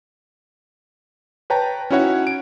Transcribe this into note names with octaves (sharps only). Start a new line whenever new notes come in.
B4 C#5 G5 A5 A#5
C#4 D#4 E4 F#4 C#5 F#5
D7